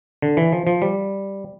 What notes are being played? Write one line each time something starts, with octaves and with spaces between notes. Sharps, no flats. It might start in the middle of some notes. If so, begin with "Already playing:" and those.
D3
E3
F3
F3
G3